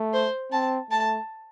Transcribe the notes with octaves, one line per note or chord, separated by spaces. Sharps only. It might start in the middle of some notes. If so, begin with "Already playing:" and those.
Already playing: A3
C5
C4 A5
A3 A5